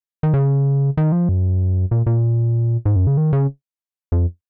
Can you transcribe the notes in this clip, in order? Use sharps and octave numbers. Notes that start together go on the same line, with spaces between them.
D#3
C#3
D#3
F3
F#2
A#2
A#2
G#2
F#2
C#3
D#3
C#3
F2